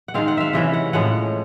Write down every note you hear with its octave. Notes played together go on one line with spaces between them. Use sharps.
F#5
D#3 G#3 C4 F5
F#5
E5 F5
C3 E3 G#3 C#4 E5
F#5
A2 F3 G#3 C#4 F#5